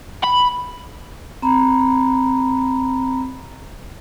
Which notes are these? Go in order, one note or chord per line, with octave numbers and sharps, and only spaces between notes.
B5
C4 A#5 B5